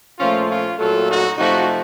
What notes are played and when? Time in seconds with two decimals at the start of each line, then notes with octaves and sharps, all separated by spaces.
0.19 A#2 F3 A3 C#4 F4
0.48 C#4 F4
0.79 A#2 F#3 A3 F4 A4
1.08 D#4 F#4
1.37 C3 F3 A3 D#4 F#4